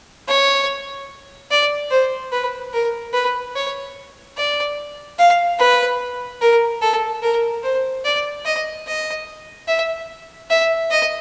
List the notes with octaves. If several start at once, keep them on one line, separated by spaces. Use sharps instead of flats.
C#5
D5
C5
B4
A#4
B4
C#5
D5
F5
B4
A#4
A4
A#4
C5
D5
D#5
D#5
E5
E5
D#5